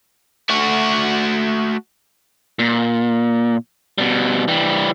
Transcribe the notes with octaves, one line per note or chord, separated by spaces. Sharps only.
A3 F#4
A#2
B2 G3
E3 G3